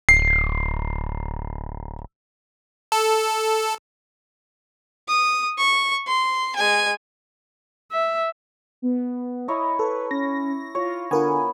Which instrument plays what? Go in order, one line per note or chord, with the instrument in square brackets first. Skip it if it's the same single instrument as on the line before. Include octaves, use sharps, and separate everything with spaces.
[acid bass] D1 [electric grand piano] C7
[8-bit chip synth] A4
[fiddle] D#6
C#6
C6
G#3 G#5
[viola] E5
[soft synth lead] B3
[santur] E4 C#5 A#5 [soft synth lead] D#5
[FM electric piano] A4 [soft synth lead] B4
[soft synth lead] C#4 [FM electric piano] A#6
[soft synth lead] F4 [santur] C#5
[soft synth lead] D3 [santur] B3 [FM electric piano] F4 A#4 G#5